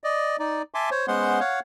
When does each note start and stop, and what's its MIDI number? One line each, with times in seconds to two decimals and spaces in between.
0.04 0.37 74
0.04 0.37 75
0.39 0.62 63
0.39 0.62 74
0.74 0.90 76
0.74 0.90 80
0.74 0.90 81
0.74 0.90 84
0.74 0.90 86
0.91 1.06 72
0.91 1.06 73
1.08 1.40 56
1.08 1.40 59
1.08 1.40 61
1.08 1.40 72
1.08 1.40 78
1.08 1.40 84
1.40 1.60 73
1.40 1.60 77
1.40 1.60 78